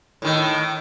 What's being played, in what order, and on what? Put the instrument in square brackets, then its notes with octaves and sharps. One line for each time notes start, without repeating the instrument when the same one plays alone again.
[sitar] A2 D#3